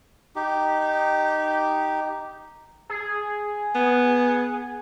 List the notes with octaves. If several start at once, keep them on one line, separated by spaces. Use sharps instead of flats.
D#4 G4
G#4
B3